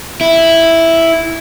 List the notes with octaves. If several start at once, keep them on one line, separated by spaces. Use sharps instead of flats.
E4